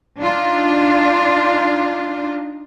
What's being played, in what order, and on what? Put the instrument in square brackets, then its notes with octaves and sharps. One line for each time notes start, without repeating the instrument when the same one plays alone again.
[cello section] D4 D#4 F4